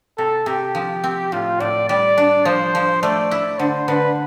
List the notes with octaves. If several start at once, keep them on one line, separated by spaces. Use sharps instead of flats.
C3 A4
C3 G4
F3
C4
A2 F4
A2 D5
G3 D5
D4
F3 C5
F3
A3 D5
E4
D3 C5
D3 B4